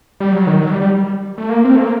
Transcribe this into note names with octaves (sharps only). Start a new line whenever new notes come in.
G3
F#3
D#3
F#3
G3
G3
A3
A#3
C4
A3
A#3